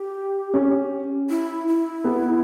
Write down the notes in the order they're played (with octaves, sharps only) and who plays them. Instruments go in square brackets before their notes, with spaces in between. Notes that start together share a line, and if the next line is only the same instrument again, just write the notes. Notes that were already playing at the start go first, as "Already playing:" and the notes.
Already playing: [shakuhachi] G4
[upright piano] C#4
[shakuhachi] E4
E4
[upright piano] B3